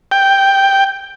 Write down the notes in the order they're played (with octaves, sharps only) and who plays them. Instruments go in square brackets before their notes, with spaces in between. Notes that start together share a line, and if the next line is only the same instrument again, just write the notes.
[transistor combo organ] G5